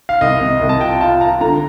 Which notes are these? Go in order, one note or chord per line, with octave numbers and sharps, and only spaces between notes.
F5
C2 D#5
C3
C2
A5
F4 G5
F4 A5
F4 A#5
D3 A#5